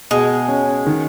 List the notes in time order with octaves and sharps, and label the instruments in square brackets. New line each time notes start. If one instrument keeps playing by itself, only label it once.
[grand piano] B2 [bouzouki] G#3
[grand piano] C#4
D#3